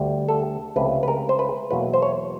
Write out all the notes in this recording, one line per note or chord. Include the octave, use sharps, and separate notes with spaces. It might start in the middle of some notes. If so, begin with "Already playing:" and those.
Already playing: D2 D3 G3
A4
C#2 C3 F3 A3 B4
B4
A#4
C5
B4
E2 B2 F#3 A#3 B4
C5
C#5